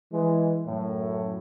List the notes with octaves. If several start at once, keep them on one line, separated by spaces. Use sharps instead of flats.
E3 G#3
F#2 A2